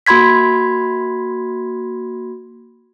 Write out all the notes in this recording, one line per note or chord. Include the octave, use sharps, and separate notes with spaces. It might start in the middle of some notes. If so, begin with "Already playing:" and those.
A#3 F#4 B5 C6 G#6 B6